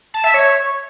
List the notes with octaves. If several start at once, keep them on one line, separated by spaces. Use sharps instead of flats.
A5
E5
C#5